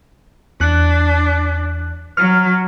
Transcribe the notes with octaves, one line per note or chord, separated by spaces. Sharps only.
E2 D4 F#6
F#3 F6